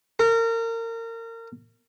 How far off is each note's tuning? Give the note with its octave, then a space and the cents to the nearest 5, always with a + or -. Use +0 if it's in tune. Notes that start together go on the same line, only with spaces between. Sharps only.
A#4 -30